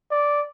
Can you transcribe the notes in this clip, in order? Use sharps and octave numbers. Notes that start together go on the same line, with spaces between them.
D5